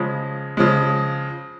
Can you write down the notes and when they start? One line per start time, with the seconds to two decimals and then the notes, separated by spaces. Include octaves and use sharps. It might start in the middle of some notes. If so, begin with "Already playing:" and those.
Already playing: C#3 F3 G#3
0.57 C#3 F3 G#3